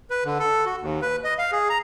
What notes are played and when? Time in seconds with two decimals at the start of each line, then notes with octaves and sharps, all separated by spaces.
0.10 B4
0.25 D3
0.40 A4
0.66 F#4
0.81 D#2
1.02 B4
1.24 D#5
1.38 F5
1.52 G#4
1.70 A#5